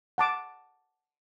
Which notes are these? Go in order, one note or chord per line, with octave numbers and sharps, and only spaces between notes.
F#5 A5 D6